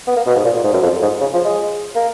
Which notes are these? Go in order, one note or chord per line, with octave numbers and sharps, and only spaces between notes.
B3
A#3
B2
G#2
A#2
A#2
G#2
F#2
F2
G#2
C#3
F3
G#3
A#3